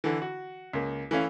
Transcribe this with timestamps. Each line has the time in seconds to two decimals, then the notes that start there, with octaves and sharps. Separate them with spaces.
0.04 D3 E3
0.22 F#4
0.73 C#2 A#3
1.11 E3 A3 C#4 F5